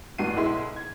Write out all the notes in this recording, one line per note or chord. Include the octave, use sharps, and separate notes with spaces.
A1 G2 F#4 C7 D#7
B1 G#3 E4 C6
G#6